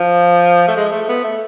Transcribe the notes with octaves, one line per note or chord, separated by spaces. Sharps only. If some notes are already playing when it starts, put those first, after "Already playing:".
Already playing: F3
A3
G#3
A3
B3
A3